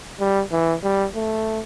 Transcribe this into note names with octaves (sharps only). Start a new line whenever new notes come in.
G3
E3
G3
A3